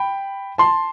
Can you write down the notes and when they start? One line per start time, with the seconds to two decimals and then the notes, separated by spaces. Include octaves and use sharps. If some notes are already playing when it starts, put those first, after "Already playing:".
Already playing: G5 B5
0.58 A5 C6